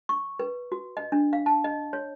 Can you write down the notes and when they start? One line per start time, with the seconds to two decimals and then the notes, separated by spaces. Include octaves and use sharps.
0.09 C#6
0.39 B4
0.72 F#4
0.97 D#5
1.12 D4
1.33 F5
1.46 A5
1.64 D#5
1.93 C#5